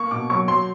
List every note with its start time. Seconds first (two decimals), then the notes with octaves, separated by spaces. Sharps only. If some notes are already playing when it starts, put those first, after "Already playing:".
Already playing: A#3 C#6
0.11 B2 D6
0.30 F#3 C#6
0.48 F#3 C6